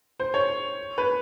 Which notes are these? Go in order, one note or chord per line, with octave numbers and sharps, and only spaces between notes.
C5
C#5
B4